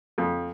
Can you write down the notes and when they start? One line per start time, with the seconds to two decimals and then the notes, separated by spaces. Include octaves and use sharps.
0.18 F2